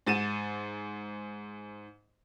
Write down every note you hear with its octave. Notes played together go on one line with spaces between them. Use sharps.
G#2 A6 D#7 E7